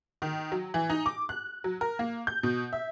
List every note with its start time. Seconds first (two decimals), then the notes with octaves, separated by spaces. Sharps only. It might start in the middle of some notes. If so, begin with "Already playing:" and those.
0.22 D#3
0.52 F#3
0.74 E3
0.90 D#4
1.06 D6
1.29 F#6
1.64 F#3
1.81 A#4
1.99 A#3
2.27 G6
2.43 B2
2.73 E5